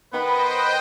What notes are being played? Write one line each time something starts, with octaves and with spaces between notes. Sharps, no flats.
D#3 B3 B4 C5 D#5 F#5 G5 B5